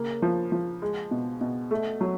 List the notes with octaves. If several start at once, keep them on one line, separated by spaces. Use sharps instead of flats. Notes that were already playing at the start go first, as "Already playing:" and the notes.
Already playing: C#3 A#3
F3
F3
G#3
B2
B2
A3
F#3